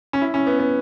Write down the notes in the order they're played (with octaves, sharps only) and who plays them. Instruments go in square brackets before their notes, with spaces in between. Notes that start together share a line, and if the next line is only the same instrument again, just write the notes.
[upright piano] C#4
E4
C#4
B3
B3